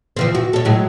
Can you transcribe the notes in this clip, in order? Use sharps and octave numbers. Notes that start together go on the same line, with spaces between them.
E3 F3 C4
F#4
A4 C#5
A2 F#3 G#3